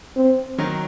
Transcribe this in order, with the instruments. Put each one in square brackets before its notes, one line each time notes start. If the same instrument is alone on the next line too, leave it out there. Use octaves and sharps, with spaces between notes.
[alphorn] C4
[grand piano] D#3 F#3